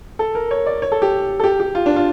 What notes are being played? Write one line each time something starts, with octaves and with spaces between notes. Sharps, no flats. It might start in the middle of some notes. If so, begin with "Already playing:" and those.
A4
A#4
C#5
D5
C#5
A4
G4
A4
G4
G4
F4
D4
F4